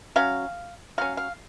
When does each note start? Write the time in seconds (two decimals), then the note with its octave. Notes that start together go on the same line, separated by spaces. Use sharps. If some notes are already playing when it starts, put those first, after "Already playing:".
0.16 F#3 C#4 F5
0.98 F#3 C#4 F5
1.17 F5